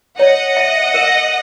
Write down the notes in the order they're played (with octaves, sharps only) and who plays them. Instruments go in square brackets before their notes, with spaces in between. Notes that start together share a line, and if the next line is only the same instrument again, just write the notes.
[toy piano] C#5 [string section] D#5 F#5
[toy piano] E5
A#4